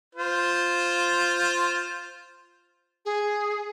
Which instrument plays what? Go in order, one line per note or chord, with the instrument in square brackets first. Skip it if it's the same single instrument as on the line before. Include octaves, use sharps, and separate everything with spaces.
[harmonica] F4 C5
[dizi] G#4